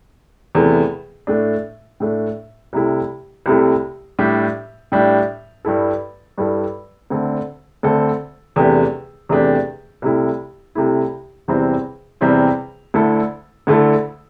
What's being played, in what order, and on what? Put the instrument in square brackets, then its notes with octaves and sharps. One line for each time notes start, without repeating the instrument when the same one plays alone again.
[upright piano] E2 C3 A3 E4
A2 A3 D4
A2 A3 D4
C2 C3 A3 E4
C2 C3 A3 E4
A2 G3 D4 G4
A2 G3 D4 G4
G2 G3 E4 A4
G2 G3 E4 A4
D2 D3 C4 A4
D2 D3 C4 A4
E2 C3 A3 D4 G4
E2 C3 A3 D4 G4
C2 C3 A3 E4
C2 C3 A3 E4
E2 C3 G3 C4 E4
E2 C3 G3 C4 E4
D2 D3 A3 E4 A4
D2 D3 A3 E4 A4